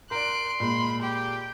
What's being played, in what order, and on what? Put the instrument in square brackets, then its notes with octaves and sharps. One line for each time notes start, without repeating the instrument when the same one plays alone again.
[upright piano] A#4 D5 [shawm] C6 [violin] F#6 D7
[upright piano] A#2 G#3 A#3 [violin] B5
[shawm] G4 [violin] G5